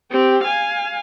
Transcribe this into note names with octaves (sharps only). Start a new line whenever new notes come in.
C4 G4
F5 G#5